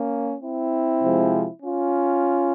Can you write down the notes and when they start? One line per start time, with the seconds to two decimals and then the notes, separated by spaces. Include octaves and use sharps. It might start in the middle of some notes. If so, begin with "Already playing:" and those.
Already playing: A#3 C#4
0.41 C4 E4
1.02 C3 F3 G#3
1.63 C#4 F4